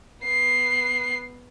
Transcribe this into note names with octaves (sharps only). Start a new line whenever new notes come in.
B3 C7